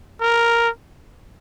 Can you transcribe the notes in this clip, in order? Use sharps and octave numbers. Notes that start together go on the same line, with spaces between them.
A#4